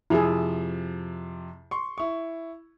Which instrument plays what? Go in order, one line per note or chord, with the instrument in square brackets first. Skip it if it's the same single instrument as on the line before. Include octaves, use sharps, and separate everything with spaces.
[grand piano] F2 C3 F3 [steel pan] E4 G#4
[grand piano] C6 C#6
E4 C#6